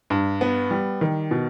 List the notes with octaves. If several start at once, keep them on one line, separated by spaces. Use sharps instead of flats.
G2
B3
G3
D#3
B2